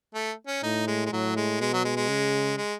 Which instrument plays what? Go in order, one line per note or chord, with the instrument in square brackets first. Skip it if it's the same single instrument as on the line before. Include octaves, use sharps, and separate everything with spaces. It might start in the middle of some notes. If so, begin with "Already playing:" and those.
[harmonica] A3
C#4
[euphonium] A2 [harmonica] D#4
[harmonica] G#3
G#3
[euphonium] A2 [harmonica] F#3
[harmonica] G#3
[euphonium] B2 [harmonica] G#3
[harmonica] F#3
G#3
G#3
[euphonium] C#3
[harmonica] G#3